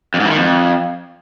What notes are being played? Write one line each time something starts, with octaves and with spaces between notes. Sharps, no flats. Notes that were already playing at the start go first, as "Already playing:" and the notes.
F2
G#2
E3
D#3
F2